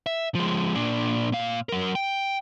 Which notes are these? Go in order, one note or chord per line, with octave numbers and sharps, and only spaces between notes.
E5
F3 G#3
A#2 D4
A#2 F5
F#3 A#4
G5